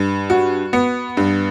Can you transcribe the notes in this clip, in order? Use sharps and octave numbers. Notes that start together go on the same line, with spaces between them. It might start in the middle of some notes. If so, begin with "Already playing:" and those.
Already playing: G2
F#4
B3
G2